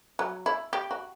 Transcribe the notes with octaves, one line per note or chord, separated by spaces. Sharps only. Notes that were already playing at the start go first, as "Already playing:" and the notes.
F#3
E4
G4
F#4